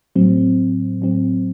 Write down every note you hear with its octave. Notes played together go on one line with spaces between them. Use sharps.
A2 F#3 C4
A2 F#3 C4